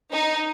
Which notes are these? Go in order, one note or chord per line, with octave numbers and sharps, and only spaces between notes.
D#4